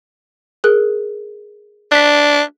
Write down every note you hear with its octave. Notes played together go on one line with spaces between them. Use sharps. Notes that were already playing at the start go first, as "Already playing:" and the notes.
G#4 A#4 F#6
D4 F#6 B6